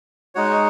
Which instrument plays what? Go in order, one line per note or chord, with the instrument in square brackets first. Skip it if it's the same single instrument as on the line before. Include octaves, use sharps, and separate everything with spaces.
[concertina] G#3 D#4 F#4 C#5